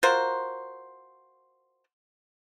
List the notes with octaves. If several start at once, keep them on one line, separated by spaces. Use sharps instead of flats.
F4 F#4 A#4 C5